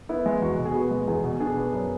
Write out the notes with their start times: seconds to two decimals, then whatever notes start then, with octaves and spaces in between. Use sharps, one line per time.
0.09 B3 E4
0.26 G#3
0.42 E2 F#4
0.58 B2
0.65 G#4
0.75 B3 F#4
0.91 G#3
1.08 E2 G#4
1.24 B2
1.40 D4 G#4
1.57 B3
1.73 F#2